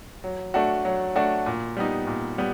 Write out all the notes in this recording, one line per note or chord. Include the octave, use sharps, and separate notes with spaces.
F#3
A3 D4 F#4
F#3
A3 D4 F#4
A#2
G3 B3 D#4
A#2
G3 B3